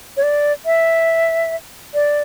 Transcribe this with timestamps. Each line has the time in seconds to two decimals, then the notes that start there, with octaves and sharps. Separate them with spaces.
0.17 C#5
0.23 D5
0.66 E5
1.94 D5